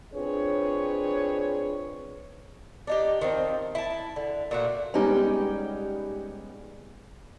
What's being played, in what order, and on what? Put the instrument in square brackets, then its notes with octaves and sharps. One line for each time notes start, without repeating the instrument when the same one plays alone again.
[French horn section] C4 D4 F4 G#4 B4 C#5
[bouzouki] D4 D#4 G4
D#3 F3 C4
E4 A5
D3
A#2 A3 F#4
[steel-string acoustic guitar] G3 G#3 B3 C#4 D#4 G4